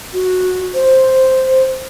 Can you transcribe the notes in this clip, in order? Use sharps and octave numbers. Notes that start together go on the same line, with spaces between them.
F#4
C5